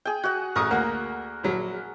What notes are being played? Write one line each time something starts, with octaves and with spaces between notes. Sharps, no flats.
G#4 G5
F#4 F#5
A1 A#4 C#6 D#6
D2 A#3 F#5
A#1 F#3